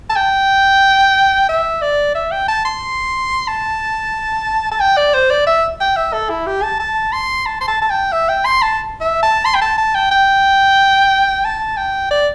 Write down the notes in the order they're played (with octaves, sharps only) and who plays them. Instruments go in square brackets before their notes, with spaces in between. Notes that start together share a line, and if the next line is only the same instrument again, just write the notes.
[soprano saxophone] A5
G5
E5
D5
E5
G5
A5
C6
A5
A5
G5
D5
C5
D5
E5
G5
E5
A4
E4
G4
A5
A5
C6
A5
C6
A5
A5
G5
E5
G5
C6
A5
E5
A5
C6
G5
A5
A5
G5
G5
A5
G5
D5